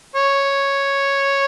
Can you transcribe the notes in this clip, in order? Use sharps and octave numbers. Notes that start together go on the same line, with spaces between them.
C#5